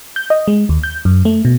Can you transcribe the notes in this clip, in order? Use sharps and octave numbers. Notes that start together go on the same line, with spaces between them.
G6
D#5
G#3
D#2
G6
F#2
A3
B2